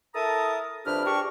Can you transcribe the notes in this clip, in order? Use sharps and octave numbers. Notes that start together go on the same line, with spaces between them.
E4 A4 A#4 A5 A#5 D#6
C2 F2 D4 G4 B4 F6
D4 G4 G#4 A#4 A5 C#6